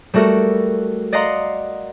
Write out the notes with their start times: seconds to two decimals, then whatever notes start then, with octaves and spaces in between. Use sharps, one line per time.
0.14 G3 A3 F#4 A4 A#4
1.12 D5 D#5 F5 F#5 A#5 C6